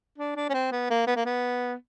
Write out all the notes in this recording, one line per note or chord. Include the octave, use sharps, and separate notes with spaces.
D4
D4
C#4
C4
B3
A#3
B3
A#3
B3